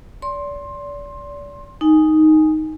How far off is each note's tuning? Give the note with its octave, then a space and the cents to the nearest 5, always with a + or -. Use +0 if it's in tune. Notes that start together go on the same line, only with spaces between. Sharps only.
D5 -35 C6 +15
D#4 +0 G#5 +0